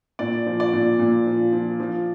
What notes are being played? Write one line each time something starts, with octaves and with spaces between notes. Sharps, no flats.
A#2 D5
F3
D5
A#2
A#2
F3
F3
F3